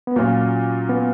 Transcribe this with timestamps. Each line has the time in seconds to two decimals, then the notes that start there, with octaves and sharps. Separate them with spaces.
0.07 B3
0.16 A#2 F#3 A#3 C#4 F4
0.89 B3